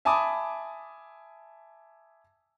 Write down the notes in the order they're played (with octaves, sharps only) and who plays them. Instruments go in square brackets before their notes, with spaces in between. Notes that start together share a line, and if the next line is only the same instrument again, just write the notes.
[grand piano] E5 G#5 A5 B5 D6 D#6